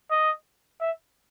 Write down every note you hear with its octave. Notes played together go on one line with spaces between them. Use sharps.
D#5
E5